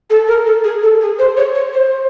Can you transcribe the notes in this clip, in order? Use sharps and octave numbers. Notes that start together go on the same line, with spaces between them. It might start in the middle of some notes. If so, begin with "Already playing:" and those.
A4
A#4
A4
G#4
A4
G#4
C5
C#5
C#5
C5